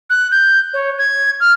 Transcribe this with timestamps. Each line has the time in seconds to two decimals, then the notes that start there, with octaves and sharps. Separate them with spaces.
0.10 F#6
0.31 G6
0.74 C#5
0.98 G#6
1.40 F6